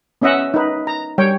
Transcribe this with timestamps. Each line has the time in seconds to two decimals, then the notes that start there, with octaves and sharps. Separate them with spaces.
0.22 B3 C#4 D#5 E5 F#5
0.54 D#4 B4
0.87 A#5
1.18 G3 C#5 G5